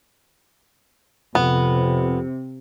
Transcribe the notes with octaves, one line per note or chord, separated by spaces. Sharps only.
F2 C3 B3